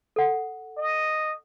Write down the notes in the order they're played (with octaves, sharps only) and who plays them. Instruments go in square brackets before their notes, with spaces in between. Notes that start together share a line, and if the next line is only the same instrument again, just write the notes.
[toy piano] A4 F#5
[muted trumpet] D#5